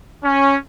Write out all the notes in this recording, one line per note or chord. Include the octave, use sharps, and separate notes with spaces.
C#4